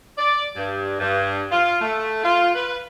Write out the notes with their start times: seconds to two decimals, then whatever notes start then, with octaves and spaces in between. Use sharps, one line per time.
0.18 D5
0.57 G2
1.00 G2
1.52 F4
1.82 A3
2.24 F4
2.55 B4